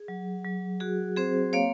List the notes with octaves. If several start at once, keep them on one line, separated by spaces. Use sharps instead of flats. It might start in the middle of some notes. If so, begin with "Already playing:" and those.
Already playing: G#4
F#3
F#3
F#4 G#4
C4 G#4 C5
A#3 C#5 F5